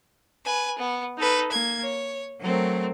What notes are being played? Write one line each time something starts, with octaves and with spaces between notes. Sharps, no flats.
B4 G#5
B3
D#4 A4 B4
A#3 G#6
C#5
F#3 A3 C4 A#4